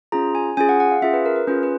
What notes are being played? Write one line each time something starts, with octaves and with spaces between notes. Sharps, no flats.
C#4 F4 G#4 A#5
G#5
C#4 F4 G#4 G#5
F#5
F#5
F5
C#4 F4 G#4 E5
B4
A#4
B4
C#4 F4 G#4 B4
B4